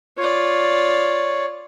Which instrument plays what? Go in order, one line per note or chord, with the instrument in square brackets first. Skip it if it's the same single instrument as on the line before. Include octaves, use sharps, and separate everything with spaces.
[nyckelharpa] F4 D5 [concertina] C#5